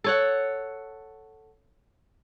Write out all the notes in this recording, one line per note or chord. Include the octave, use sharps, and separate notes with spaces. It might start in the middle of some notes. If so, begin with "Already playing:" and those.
A4 C#5 F#5